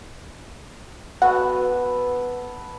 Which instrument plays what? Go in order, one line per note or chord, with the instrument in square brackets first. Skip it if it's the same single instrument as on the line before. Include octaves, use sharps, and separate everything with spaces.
[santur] B3 A4 [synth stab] F#4